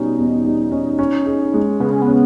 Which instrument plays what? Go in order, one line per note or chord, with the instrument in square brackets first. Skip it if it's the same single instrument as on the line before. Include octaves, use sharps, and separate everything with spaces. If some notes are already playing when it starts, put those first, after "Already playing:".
Already playing: [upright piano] B2 G3 C#4 [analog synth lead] D#4
[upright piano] E2
G3
C#4
C#4
G#4
G#3
[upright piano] C#3 [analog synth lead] B3
[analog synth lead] C#4
B3
[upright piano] C#4